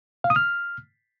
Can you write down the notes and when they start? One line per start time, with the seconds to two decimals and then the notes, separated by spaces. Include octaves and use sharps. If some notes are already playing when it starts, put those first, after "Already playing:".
0.24 F5
0.30 D#6
0.36 F6